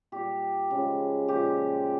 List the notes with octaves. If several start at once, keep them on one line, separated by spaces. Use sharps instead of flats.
A#2 G3 G4
C#3 F3 G#3
A#2 F3 G#3 G4